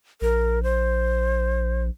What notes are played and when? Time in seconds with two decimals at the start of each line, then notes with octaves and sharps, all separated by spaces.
0.21 A#1 A#4
0.63 C5